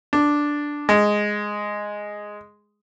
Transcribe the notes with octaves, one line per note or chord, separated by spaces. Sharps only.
D4
G#3